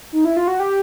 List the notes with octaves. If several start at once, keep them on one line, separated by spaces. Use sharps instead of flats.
D#4
E4
F4
F#4
G4